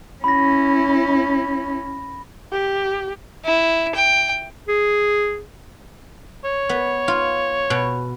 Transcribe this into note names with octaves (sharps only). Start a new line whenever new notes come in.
C#4 E4 B5 A#6
G4
E4
G5
G#4
C#5
B3
F4
B2